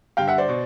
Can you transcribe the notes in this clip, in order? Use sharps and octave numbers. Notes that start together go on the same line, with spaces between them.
G2 D3 F5 G5
E5 F#5
C5 D5
B2